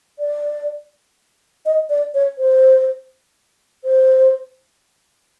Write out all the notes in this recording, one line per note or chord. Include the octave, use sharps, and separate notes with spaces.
D5
D#5
D5
C#5
C5
C5